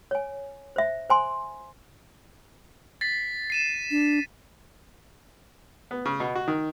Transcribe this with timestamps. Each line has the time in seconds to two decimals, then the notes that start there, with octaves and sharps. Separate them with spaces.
0.11 C#5 G#5
0.76 C5 E5
1.10 C5 G#5 C6
3.01 A6 B6 C7
3.50 C7 D#7 E7
3.91 D4
5.91 B3
6.06 C#3
6.20 B2
6.35 F#4
6.48 D#3